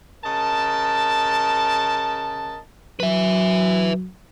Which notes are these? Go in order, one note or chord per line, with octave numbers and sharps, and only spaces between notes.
C#3 A#4 D#5 A5
F#3 B4 E5